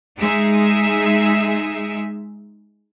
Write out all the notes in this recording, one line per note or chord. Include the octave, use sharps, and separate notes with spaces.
G#3 D#4 G#4 E5